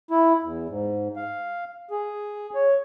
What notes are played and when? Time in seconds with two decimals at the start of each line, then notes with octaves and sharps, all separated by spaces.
0.11 E4
0.44 E2
0.69 G#2
1.16 F5
1.91 G#4
2.55 C#5